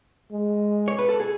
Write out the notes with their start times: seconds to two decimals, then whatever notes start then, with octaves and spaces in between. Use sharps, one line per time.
0.31 G#3
0.88 C#5
0.99 B4
1.09 A4
1.20 G#4